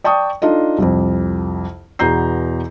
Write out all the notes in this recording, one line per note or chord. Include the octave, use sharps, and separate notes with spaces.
D5 G5 A5 C#6 D#6
D4 D#4 F4 A4 D#5
C2 F2
E2 B2 B3 A#5 G6 C7